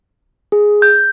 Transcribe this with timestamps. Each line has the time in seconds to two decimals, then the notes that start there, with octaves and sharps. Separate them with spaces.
0.52 G#4
0.82 G6